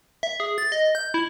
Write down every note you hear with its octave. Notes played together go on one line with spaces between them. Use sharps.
E5
G#4
A6
D#5
G6
E4